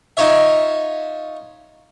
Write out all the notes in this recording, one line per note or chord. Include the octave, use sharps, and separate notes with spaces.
D#4 F4 C#5 E5